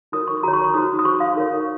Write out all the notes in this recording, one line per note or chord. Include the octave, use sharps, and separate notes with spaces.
D#4 F#4 A#4 C#5 D#6
C#6
F#4 C#5 A#5
C#6
C#6
D#4 F#4 C5 D#6
D#6
F#4 C5 C#6
F5
D#4 A#4 C#5